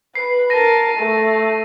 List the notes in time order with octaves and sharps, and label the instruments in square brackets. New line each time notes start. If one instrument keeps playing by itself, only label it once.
[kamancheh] B4 [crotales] C7
[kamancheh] A#4 A5 [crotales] A#6 D#7
[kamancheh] A3